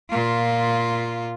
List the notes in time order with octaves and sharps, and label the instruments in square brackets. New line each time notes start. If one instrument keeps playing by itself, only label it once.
[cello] A#2 F4